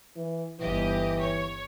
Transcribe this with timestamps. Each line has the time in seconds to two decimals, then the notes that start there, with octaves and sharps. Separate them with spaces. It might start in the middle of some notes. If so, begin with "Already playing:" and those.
0.16 E3
0.60 G1 E3 G4 D#5
1.20 C#5